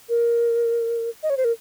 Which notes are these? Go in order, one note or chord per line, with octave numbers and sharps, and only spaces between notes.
A#4
D#5
C#5
C5
A#4